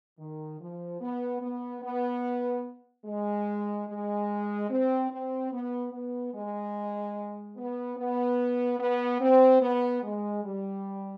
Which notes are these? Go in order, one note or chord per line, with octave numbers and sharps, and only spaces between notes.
D#3
F3
B3
B3
B3
G#3
G#3
C4
C4
B3
B3
G#3
B3
B3
B3
C4
B3
G#3
G3